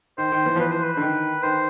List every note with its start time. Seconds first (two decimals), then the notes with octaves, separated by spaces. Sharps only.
0.18 D#3 C5
0.32 D#3
0.46 E3
0.56 F3
0.60 E3 B4
0.71 C5
0.83 B4
0.97 D3
1.01 D#3
1.43 D#3 C5